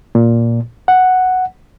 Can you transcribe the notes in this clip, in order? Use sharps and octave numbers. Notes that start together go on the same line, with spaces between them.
A#2
F#5